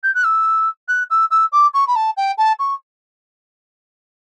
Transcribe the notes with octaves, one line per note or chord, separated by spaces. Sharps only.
G6
F#6
E6
F#6
E6
E6
D6
C#6
B5
A5
G5
A5
C#6